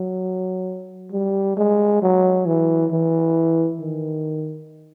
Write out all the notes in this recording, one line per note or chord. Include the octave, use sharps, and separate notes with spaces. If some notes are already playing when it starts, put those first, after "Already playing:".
Already playing: F#3
G3
G#3
F#3
E3
E3
D#3